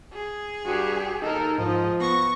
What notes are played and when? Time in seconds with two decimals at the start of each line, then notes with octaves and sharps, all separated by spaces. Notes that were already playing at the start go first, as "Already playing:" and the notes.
0.13 G#4
0.65 G2 F#4 G4
1.22 D#2 D#4 A4 A#4
1.58 G#2 F3 D#5
2.01 B3 C#6 A#6